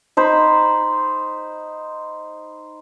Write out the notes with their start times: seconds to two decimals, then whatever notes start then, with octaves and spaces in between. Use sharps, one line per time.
0.17 D#4 C5 B5